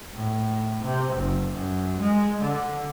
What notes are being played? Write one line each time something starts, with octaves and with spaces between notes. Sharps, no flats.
A2
C3
F#1
F#2
G#3
D3